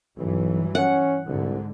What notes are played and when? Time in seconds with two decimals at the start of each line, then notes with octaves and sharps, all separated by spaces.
0.18 B1 G2 E3 F#3
0.75 C#4 F#5
1.27 C2 G#2 D3